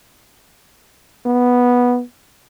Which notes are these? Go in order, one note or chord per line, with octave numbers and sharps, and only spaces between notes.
B3